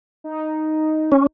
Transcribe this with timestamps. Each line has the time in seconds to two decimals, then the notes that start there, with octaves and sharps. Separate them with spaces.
0.24 D#4
1.12 C#4